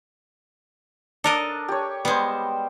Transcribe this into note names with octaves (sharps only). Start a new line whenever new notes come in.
D4 A4 A#4 D#5
G4 C#5
G3 G#3 B3 C5